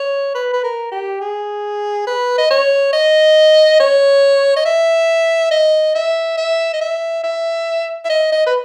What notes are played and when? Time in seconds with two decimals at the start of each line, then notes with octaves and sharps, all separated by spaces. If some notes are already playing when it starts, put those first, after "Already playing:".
Already playing: C#5
0.35 B4
0.53 B4
0.64 A#4
0.92 G4
1.21 G#4
2.07 B4
2.38 D#5
2.50 C#5
2.93 D#5
3.80 C#5
4.56 D#5
4.65 E5
5.51 D#5
5.95 E5
6.37 E5
6.73 D#5
6.81 E5
7.24 E5
8.05 E5
8.09 D#5
8.32 D#5
8.46 B4